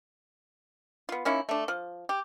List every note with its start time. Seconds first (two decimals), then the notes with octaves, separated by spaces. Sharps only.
1.09 B3 F4
1.25 A#3 C#4 D#4 E4
1.49 A3 D4
1.68 F3
2.09 G4